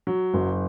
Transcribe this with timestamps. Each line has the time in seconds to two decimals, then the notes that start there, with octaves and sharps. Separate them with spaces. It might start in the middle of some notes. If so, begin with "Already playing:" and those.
0.07 F#3
0.34 F#1